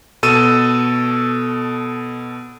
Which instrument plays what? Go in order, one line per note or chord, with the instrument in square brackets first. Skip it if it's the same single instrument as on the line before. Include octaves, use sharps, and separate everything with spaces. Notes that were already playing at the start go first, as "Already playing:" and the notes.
[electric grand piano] B2 A4 E6 A6 D#7 E7